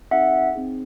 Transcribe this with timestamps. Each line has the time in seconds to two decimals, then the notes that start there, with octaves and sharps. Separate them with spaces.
0.11 C4 D#4 G#4 E5 F#5
0.55 C4 D#4 G#4